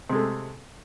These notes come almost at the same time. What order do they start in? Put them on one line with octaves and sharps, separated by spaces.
C3 G#3 A3